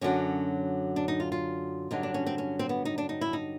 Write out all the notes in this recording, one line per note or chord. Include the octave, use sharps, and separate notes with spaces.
F#2 D3 F#3 C#4
D4
D#4
F4
F4
G2 D3 F#3 D#4
D4
C#4
C4
C#4
C4
B3
D#4
D4
D#4
E4
D#4